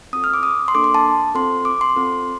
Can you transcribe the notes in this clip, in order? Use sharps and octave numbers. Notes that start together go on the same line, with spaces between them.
C4 F4 A4 D#6
F6
D6
D#6
C6
A#3 D4 A4 D6
C6
A5
C4 F4 A4 C6
D6
C6
C4 F4 A4